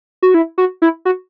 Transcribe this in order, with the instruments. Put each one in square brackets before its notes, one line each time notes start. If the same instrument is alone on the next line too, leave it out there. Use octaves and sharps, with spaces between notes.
[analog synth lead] F#4
E4
F#4
E4
F#4